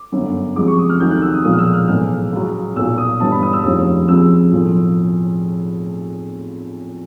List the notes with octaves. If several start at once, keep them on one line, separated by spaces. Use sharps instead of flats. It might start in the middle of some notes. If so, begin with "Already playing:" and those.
Already playing: D6
G1 F#2 D3
C#2 C3 F3 G#3 D6
C#6
D#6
F6
D2 C3 D#3 F#3 G6
F#6
E6
D#6
B1 A#2 F3 G#3 D#6
F6
E6
F6
B1 A2 E3 G#3 F6
C#2 C#3 F#3
B1 A#2 F#3 E6
D#6
G1 G2 E3 A5
B5
D#6
E6
F1 D#2 C#3 F3
C#2 C3 F3 E6
B1 A2 F3